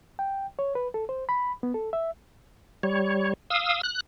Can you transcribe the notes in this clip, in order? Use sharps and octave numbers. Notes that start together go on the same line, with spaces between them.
G5
C#5
B4
A4
C5
B5
B3
A4
E5
G3 C#5
F5 D#6 E6
F#6